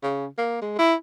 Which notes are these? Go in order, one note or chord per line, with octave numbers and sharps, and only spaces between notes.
C#3
A#3
G#3
E4